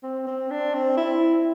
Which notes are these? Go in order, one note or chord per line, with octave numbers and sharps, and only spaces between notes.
C4
C4
D4
C4
E4